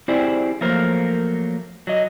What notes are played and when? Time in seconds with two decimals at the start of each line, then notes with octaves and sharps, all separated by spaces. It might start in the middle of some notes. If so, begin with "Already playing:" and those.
0.08 C4 E4 G4 G#4 C5 D5
0.61 F3 F#3 A3 A#3 A#4 C5
1.87 F#3 D#5